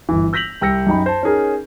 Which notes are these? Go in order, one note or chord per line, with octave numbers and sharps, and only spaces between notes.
G1 E3
E6 G6 A#6 B6 F7 F#7
C2 G5 E6 A#6 C#7
F#2 D#4 G5 B5
C5 A5
C#4 D#4 G#4 A#4